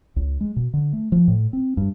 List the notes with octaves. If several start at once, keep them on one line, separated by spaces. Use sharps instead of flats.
C#2
G#3
B2
D3
A3
F3
A2
C4
G2